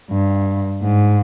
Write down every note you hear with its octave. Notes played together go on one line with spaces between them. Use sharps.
G2
G#2